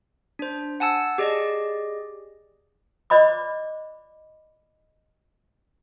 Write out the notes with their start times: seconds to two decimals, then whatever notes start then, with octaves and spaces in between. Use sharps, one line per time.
0.39 D4 C5
0.80 F#5 G#5 A5 E6 C#7
1.18 G4 G#4 D5 D#5
3.10 C5 D5 D#5 B5 D6